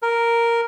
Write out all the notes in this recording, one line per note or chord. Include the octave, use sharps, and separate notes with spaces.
A#4